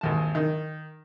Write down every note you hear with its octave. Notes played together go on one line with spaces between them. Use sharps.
G#1 D#2 A5
D#3